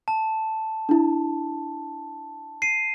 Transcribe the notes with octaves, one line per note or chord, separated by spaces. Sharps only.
A5
D4 E4
C7 D#7